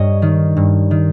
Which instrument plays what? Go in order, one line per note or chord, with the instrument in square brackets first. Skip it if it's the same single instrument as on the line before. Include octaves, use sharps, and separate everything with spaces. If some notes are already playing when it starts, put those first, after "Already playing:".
Already playing: [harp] G2 C#5 D#5
D#3
G2
D#3